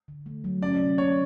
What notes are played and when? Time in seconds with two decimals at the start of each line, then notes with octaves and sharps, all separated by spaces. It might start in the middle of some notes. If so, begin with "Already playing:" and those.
0.08 D3
0.26 A3
0.44 F#3
0.62 C#4 D5
0.80 C3
0.98 A#3 C#5